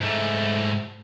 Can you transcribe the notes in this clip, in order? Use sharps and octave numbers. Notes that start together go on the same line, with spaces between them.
G#2 A3